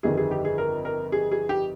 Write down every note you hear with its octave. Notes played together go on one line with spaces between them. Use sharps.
G1 F2 D#3 G#4
G#4
G4
G#4
A#4
A#4
G#4
G#4
G4